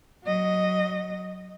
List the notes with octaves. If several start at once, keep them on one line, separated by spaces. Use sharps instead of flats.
F#3 D#5